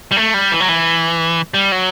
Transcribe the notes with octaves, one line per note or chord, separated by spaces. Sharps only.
G3
A3
G3
E3
F#3
E3
G3
F#3